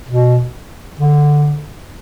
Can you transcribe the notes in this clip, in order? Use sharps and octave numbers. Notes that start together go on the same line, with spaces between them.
B2
D3